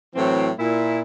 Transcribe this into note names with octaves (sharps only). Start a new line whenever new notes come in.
A2 E3 F#3 C4
A#2 E4